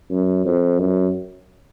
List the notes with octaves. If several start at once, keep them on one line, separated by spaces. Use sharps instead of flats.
F#2
F2
F#2